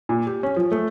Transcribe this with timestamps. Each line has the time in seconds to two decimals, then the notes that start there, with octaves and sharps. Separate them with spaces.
0.09 A#2
0.27 G4
0.43 C#4
0.56 F3
0.72 A3